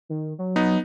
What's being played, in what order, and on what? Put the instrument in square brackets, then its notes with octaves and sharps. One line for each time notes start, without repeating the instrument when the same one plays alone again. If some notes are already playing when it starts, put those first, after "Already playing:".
[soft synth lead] D#3
F#3
[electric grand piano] B3 D#4